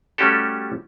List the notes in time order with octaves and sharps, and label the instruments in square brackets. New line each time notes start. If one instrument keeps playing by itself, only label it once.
[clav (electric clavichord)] G3 A3 C#4 F#4 G4 A4